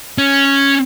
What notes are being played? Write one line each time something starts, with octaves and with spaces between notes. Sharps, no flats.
C#4